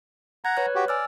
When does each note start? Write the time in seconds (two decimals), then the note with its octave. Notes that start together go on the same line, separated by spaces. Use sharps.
0.45 F#5 A#5 G#6
0.57 B4 C#5 F#6
0.75 F#4 G4
0.88 D5 G#5 E6 F6